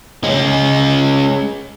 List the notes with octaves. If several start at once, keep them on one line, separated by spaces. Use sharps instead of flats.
G#3 C#4